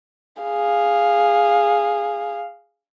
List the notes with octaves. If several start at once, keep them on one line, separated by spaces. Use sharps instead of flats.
G#4 F5